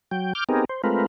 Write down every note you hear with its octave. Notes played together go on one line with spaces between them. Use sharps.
F#3 G5
D6 F6 G6
B3 C4 D#4 G4 G#4 A#4
C5
G#3 A3 C4 F4 A#4 B4